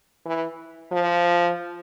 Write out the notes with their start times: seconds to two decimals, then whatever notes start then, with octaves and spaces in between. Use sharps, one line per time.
0.25 E3
0.92 F3